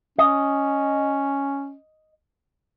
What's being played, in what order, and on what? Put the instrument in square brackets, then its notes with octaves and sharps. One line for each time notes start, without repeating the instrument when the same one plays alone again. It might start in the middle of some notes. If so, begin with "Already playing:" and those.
[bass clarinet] C#4 [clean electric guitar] D#5